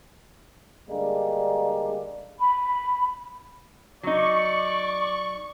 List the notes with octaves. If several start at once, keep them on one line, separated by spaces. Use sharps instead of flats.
D3 G3 G#3 A#3 D4
B5
F#3 D#4 D5 C#6